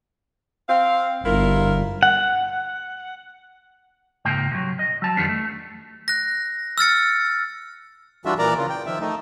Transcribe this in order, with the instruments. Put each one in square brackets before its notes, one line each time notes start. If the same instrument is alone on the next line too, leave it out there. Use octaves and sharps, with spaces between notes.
[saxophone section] C4 F5
[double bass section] G1 [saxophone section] E4 F4 A#4
[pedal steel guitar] F#5
[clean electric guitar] C#2 G#2 A#3 G5
C3 F#3
D#5
F#3 A5
F2 D#3 F3 G3 B3 D4
A3
[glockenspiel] F#6 A#6
E6 F6 A6 C#7
[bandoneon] E3 G3 D4 F4 F#4 E5
A#2 E3 A#4 D5 A#5
C#3 E3 F4
G5
D#3 F3 E5
A3 D#4